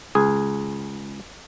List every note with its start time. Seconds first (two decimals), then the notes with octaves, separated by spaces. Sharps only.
0.15 C#2 G#4